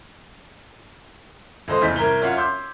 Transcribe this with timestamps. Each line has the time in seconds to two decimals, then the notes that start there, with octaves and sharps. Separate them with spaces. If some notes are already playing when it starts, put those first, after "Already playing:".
1.68 C#2 A4 C5 D#5 C6
1.81 F1 E2 G6 B6
1.96 C2 A#4 A#5 G#6 B6 G7
2.21 F#2 F4 C#5 E5 F#5
2.37 C6 D6 E6 G6